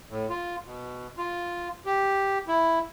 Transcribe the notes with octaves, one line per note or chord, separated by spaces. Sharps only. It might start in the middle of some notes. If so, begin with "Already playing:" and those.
A2
F4
B2
F4
G4
E4